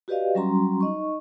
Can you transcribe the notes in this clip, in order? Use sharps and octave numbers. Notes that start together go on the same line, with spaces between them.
F#4 G4 B4 D5 D#5 F5
F#3 G3 C#4 F#4 A#5 C6
D#4 D#5 C#6